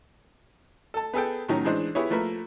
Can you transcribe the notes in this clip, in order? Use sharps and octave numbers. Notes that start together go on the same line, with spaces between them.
A4 A5
B3 G#4 A4 G5
A2 D#3 F#3 C#4 D#4
E3 G#3 D4 C5
B3 E4 G4 G#4 C#5
F3 A3 A#3 B4